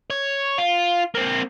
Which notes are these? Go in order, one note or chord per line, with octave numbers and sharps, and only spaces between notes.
C#5
F4
A#3 C4